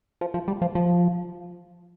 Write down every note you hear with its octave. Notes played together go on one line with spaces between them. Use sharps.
F3
F3
G3
F3
F3